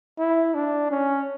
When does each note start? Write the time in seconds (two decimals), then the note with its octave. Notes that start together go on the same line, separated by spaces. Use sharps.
0.19 E4
0.54 D4
0.90 C#4